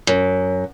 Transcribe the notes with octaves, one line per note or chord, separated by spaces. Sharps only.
F#2